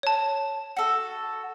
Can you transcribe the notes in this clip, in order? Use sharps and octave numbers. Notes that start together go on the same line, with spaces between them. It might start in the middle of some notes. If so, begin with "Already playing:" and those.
C#5 A5
F#4 A4